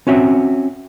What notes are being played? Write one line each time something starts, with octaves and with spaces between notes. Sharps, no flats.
C4 C#4 F#4 E5